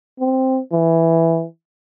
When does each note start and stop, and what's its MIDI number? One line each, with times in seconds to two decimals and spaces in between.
0.19 0.59 60
0.72 1.44 52